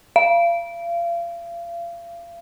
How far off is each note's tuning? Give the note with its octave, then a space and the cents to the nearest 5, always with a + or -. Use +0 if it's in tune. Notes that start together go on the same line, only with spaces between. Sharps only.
F5 -35